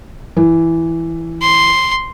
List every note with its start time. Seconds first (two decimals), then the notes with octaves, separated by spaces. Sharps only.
0.37 E3
1.42 C6